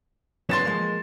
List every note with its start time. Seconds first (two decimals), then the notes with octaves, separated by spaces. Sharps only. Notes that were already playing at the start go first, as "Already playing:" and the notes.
0.49 F#3 B3 C#4 C6 A6 E7
0.65 F3 G#3 A#3